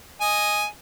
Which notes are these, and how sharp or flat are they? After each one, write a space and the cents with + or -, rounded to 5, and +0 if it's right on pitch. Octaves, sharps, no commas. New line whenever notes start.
D#5 +0 G#5 +0